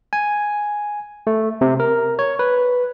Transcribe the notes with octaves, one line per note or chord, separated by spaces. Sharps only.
G#5
A3
C3
A#4
C#5
B4